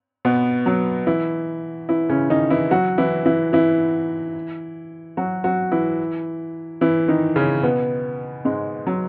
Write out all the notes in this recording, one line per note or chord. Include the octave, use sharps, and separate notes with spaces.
B2 B3
F#3
E3 E4
E3 E4
C#3 C#4
D#3 D#4
E3 E4
F#3 F#4
E3 E4
E3 E4
E3 E4
F#3 F#4
F#3 F#4
E3 E4
E3 E4
D#3 D#4
C#3 C#4
B2 B3
G#2 G#3
F#3